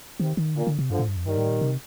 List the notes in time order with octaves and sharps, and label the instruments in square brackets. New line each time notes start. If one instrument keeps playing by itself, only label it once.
[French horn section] C3 [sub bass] D#3
[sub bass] D#3
[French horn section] A#2 [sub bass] D3
[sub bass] D3
C3
[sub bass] G2 [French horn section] D3 F3
[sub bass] A2
G2
F2
[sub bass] G2 [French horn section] D#3 G3
[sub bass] A2
A#2
C3